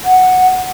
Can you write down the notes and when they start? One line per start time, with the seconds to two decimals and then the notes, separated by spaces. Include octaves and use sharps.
0.04 F#5